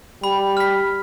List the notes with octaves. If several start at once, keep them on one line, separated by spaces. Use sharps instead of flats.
G3 B5
F6 B6